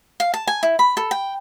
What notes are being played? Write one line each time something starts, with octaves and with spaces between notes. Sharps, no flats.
F5
A5
G#5
E4
B5
A4
G5